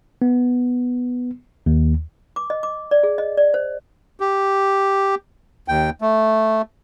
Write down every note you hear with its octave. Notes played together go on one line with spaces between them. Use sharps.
B3
D#2
D6
D#5
D6
D5
G#4
D#5
D5
C5
G4
D#2 G5
A3